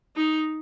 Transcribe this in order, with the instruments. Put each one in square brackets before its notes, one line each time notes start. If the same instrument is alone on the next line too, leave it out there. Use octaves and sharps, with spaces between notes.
[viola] D#4